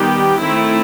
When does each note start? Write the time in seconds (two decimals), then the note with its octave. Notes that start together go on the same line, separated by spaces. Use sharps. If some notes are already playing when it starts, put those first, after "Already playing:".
Already playing: D#3 G3 B3 G4
0.40 D#3 A3 C4 E4